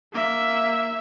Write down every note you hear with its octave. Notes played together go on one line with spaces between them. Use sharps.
A#3 E5